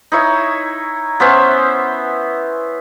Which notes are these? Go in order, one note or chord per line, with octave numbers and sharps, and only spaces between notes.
D#4 E4 C#5
B3 C#4 C5 E5